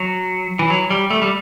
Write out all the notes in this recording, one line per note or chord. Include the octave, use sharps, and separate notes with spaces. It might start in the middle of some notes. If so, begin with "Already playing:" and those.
Already playing: F#3
E3
F#3
G3
A3
G3